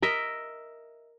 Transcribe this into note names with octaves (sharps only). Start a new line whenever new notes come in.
A#4 D#5 E5